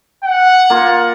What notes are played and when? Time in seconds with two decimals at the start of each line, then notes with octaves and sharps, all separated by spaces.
0.24 F#5
0.70 A#3 F4